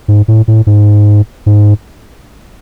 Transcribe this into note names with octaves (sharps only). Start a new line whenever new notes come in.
G#2
A2
A2
G#2
G#2